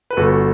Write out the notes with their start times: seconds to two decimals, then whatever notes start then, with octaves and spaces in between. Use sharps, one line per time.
0.11 B4
0.17 G1 F#4 A4